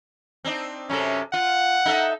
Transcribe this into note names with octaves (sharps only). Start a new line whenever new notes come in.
C4 D4 D#4
F#2 C3 C#4 A4
F4 F#5
D#4 A4 E5